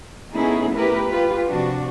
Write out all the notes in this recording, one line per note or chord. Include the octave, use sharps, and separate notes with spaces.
A3 B3 C#4 D#4 E4 G#4
A3 E4 G4 A#4 B4
F4 G4 B4
C3 F3 D4 F#4